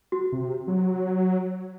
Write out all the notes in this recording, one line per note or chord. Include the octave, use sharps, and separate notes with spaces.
F#4
C3
F#3